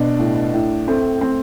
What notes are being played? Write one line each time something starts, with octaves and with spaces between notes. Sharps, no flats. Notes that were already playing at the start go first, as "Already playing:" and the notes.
Already playing: B2 D4
A2
A2
A3 C4
A3 C4